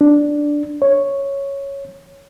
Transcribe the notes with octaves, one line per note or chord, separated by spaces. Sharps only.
D4
C#5